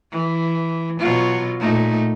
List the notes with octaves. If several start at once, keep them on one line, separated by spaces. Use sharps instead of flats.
E3
B2 F#3 F4
A#2 A3 D#4